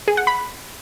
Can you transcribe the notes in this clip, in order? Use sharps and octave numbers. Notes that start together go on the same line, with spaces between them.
G#4
F#5
B5